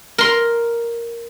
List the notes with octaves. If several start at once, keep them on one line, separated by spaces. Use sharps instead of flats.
A#4 C6